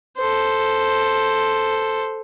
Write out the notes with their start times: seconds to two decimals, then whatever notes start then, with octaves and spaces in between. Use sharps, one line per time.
0.18 A4 C5